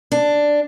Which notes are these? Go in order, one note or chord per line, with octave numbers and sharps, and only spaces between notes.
D4